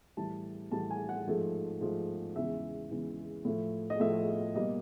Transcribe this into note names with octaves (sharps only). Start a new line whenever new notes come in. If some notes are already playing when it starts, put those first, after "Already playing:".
A2 E3 G3 A5
A2 E3 G3 A5
G#5
F#5
G#2 F3 A3
G#2 F3 A3
E2 C#3 E3 G#3 E5
E2 C#3 E3 G#3
A2 F3 A3
D#5
A2 F3 A3 E5
B2 G3 A#3 D#5